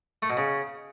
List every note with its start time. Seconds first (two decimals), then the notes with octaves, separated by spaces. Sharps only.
0.22 A3
0.30 B2
0.37 C#3